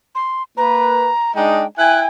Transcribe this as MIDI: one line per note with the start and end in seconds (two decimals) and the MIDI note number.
0.15 0.43 84
0.57 1.11 58
0.57 1.11 71
0.57 1.32 82
1.36 1.63 56
1.36 1.63 62
1.36 1.63 63
1.36 1.66 79
1.78 2.08 64
1.78 2.08 79
1.78 2.08 80
1.78 2.00 90